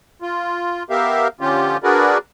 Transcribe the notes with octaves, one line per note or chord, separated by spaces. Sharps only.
F4
B3 G4 A#4 E5 F5
D3 F3 C#4 F4 G4
D4 F#4 G#4 A#4 B4 D5